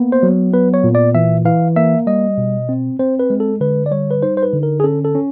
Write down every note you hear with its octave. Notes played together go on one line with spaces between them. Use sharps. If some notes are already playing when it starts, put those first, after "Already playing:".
Already playing: A#3 B3
C5
F#3
B3 B4
C#5
A#2
D5
E3 E5
E3 F5
A#3 E5
G3 D#5
B2
C4
C4 C5
B4
G#3
A4
D3 B4
D5
G3 C#5
B4
D#4 C5
C5
B4
D3
A#4
G#4
C#4 A4
A4
C#4